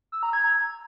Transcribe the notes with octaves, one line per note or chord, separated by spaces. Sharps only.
E6
A#5
G#6